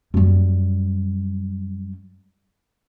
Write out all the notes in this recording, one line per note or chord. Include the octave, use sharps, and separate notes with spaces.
F#2 G3